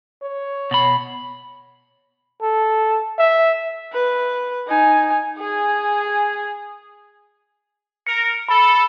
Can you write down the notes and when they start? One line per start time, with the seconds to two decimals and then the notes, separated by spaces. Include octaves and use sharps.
0.22 C#5
0.71 B2 B5
2.42 A4
3.19 E5
3.93 B4
4.68 D#4 G#5
5.37 G#4 G#5
8.07 A#4 C#7
8.49 A4 B5